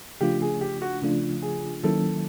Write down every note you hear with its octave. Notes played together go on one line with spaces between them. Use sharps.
C#3 F3 A3 D4 F4 G4
G#4
G4
F#4
C#3 F3 A3 D4 F4
G#4
D#3 F#3 A#3 C#4 E4 A4